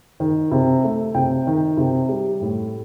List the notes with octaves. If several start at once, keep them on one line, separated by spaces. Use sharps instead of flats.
D#3
C3
A3
C3 G5
D#3
C3
G3
A2